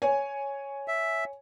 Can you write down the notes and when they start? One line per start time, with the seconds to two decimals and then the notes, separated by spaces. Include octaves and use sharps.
0.02 C#5 G#5
0.88 E5